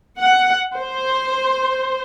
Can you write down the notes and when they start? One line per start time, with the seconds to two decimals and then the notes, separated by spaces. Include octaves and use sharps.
0.19 F#5
0.78 C5